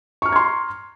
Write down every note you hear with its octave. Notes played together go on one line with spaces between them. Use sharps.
A#5 C6 C#6 F6 G#6